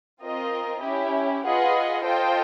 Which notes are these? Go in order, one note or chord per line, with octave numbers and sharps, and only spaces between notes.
C4 F4 A#4 D#5
C#4 E4 G4
F4 G#4 B4 D#5 F#5
F4 A4 C5 D#5 G5